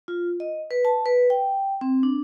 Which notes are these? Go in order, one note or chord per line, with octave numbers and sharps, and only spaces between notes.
F4
D#5
B4
A5
B4
G5
C4
D4